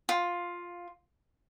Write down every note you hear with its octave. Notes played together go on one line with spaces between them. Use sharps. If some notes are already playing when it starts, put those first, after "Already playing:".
F4